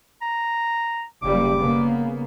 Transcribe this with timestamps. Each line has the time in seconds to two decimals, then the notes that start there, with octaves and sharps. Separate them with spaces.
0.22 A#5
1.22 F#1 G3 A#3 D6
1.56 C#3 A#3 B3